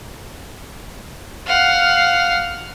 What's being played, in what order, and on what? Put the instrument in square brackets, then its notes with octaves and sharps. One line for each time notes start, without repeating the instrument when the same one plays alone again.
[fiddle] F5 F#5